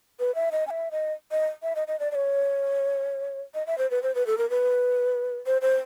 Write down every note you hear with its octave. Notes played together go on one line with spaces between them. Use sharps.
B4
E5
D#5
G#5
E5
D#5
D#5
E5
D#5
D#5
D5
D5
C#5
D#5
E5
C5
B4
C5
B4
A4
A#4
B4
C5
C5